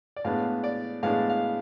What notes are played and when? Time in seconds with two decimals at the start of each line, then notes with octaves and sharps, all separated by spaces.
0.17 D5
0.25 A2 G#3 B3 D4 F5
0.64 D5
1.03 A2 G#3 B3 D4 F5
1.30 F5